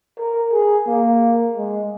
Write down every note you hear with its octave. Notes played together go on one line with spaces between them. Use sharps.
A#4
G#4
A#3
G#3